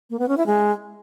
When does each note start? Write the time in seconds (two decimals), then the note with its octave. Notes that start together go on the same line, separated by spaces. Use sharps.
0.10 A#3
0.19 B3
0.28 C#4
0.37 E4
0.46 G#3